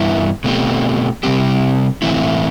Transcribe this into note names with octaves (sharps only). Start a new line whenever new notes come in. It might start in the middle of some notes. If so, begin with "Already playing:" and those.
Already playing: G2 E3 B3 E4
B2 A3 C4 G4
C3 G3 C4 G4
A2 E3 A3 C4 E4